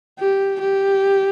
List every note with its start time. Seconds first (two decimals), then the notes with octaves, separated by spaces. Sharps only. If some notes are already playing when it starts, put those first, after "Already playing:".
0.19 G4
0.61 G4